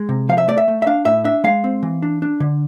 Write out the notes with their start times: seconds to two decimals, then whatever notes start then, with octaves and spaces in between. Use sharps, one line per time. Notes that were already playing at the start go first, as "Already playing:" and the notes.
Already playing: G#3
0.09 C3
0.29 F3 F5
0.38 E5
0.48 A3 D5
0.58 E5
0.68 A3
0.82 E5
0.87 D4 F5
1.05 A2 E5
1.24 D4 E5
1.44 G#3 F5
1.64 C4
1.83 E3
2.02 D4
2.22 D4
2.40 D3